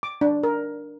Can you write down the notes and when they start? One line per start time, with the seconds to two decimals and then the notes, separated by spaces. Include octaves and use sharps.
0.03 D6
0.21 D4
0.43 A#4